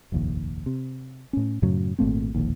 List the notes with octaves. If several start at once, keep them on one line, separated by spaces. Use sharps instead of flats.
F1 A#1 D#2
C3
A2 C#4
F#2 A2 C#3 F#3
G#1 A#2 A3 C4
E1 A#1 D#2